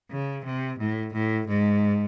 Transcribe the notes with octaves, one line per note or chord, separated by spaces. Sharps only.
C#3
C3
A2
A2
G#2